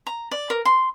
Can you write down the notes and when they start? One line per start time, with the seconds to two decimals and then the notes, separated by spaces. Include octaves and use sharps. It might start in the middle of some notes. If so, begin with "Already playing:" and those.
0.07 A#5
0.31 D5
0.50 A#4
0.65 C6